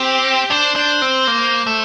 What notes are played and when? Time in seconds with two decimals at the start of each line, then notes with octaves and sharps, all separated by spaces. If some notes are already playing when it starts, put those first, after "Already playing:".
Already playing: C4 G4
0.50 D4 C5
0.76 D4
1.02 C4
1.27 A#3
1.67 A3